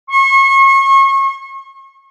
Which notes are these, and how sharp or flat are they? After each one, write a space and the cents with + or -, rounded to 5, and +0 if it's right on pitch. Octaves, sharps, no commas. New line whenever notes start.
C#6 -35